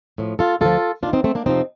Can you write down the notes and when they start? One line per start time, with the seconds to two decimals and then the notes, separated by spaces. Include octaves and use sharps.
0.18 A2 F3
0.39 F4 A4
0.61 D2 D3 F3 F4 A4
1.02 D#2 D4 F4
1.06 D#3
1.13 C4 D#4
1.24 A3 C4
1.35 A#3 D4
1.45 F2 C3 F3 C4 D#4